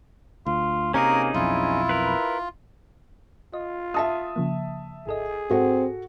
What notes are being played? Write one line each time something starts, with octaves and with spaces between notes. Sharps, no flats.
D2 F4
C3 A#3 C#4 D#4 G#4 A#4
B1 F2 E4 F4
A#4 B4
F4 D#5
E5 A5 D#6
C#3 F3 A#3
G#1 G#4 A4 D#5
G#2 C4 F#4 A4